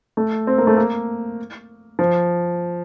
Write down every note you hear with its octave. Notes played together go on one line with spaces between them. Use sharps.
A3
C4
A#3
A3
A#3
F3